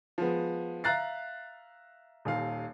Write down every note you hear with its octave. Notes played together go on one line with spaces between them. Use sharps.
F3 G#3 B3
E5 F5 A#5 F#6 A6 C7
D#1 D#2 F5